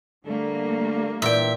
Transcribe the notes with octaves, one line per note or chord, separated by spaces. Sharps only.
D3 G3 A3 A#3
A#2 E3 E5 G5